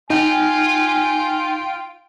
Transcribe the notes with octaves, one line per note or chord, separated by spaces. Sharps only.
D#4 F4 G5 G#5